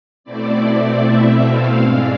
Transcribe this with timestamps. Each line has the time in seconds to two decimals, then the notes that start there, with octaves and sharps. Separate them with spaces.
0.24 B2 A3 C4 E4 D5
1.01 E5
1.40 F5
1.78 G#2 G#3 D4